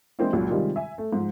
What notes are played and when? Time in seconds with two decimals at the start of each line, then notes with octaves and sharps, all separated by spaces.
0.19 E3 G#3 A#3 C4 D4 E4
0.33 C#2 A#2 F#3
0.49 C3 D#3 G3 G#3 F4
0.76 E5 G#5
0.98 A3
1.13 G#2 F3